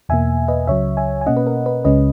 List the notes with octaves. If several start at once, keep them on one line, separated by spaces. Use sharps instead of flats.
E2 B2 A#3 E5 G#5
B4 D#5
C#2 C#3 F#3 C#5 E5
E5 G#5
G#5
B2 A#3 C#4 D#5 F#5
B4
A#4
B4
C#2 C#3 G#3 C#4 B4 D#5